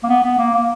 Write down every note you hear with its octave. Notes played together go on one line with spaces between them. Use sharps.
A#3
B3
B3
A#3
A#3